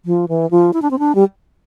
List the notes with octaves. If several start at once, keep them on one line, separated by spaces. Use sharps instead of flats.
F3
E3
F3
E4
D4
C4
D4
G3